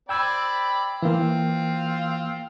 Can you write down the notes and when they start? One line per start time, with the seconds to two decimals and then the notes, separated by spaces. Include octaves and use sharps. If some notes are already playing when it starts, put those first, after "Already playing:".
0.09 C4 D5 G5 B5 E6 G#6
1.02 E3 A#3 C4 F4